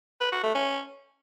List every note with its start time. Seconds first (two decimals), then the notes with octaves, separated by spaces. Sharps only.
0.21 B4
0.32 F#4
0.44 A3
0.55 C#4